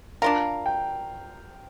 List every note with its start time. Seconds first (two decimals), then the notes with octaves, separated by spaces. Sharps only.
0.22 D4 F4 A#4 F5
0.66 G5